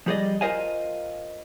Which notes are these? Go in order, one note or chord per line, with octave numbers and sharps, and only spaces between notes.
F3 G3 G#4 B4 D5 D#5
F4 A#4 C5 D#5 F5 G#5